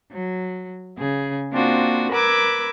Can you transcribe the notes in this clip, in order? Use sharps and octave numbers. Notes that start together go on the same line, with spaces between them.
F#3
C#3 G#4
A#3 C4 D4 F4 F#4
A#4 B4 B5 D6 E6 G#6